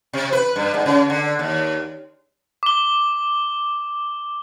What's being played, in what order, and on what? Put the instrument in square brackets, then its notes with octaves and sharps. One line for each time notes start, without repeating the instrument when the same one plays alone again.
[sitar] C3
B4
G2
G#2
C#3
D3
D#2
[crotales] D6 G7